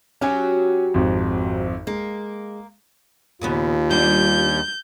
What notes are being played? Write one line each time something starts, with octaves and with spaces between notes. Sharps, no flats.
F#3 C#4 F#4 G4 G#5
G#1 F2
G#3 A#3
D#2 A#2 C#3 B3 F4
G3 B3 D4 G6